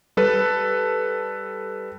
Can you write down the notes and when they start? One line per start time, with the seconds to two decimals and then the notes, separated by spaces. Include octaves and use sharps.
0.17 G3 A4 B4